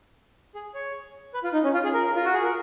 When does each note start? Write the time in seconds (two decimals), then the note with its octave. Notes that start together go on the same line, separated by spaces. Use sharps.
0.55 G#4
0.74 C#5
1.34 B4
1.44 F4
1.53 D#4
1.64 C#4
1.74 F4
1.84 G#4
1.93 A#4
2.16 F4
2.25 F#4
2.34 G#4
2.43 A#4